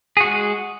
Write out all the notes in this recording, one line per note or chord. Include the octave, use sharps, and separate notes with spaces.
G#3 F#4 G#4